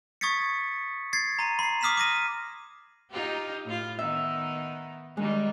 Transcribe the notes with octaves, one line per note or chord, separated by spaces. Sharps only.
C#6 D#6 G#6 A6 B6 C#7
G#6 A6 C7
A#5 C6 D#7
B5 C7
D6 D#6 F6 B6 C7 E7
D6 D#6 A#6 D#7
D#4 F4 G4
A2 F4
D#3 B3 D#4 E5
D#3 G3 G#3